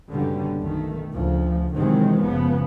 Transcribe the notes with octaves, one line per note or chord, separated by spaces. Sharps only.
F#1 B2 D3 G3 C#4
B1 D#3 A3
D2 C#3 F3
C3 D#3 E3 F#3 G#3 C4
F#1 C#3 F3 B3